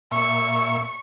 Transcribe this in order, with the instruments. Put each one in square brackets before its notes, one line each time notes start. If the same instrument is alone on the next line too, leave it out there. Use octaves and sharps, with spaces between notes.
[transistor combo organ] A#2 E5 [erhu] C#6